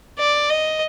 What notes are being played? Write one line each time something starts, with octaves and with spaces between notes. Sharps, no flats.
D5
D#5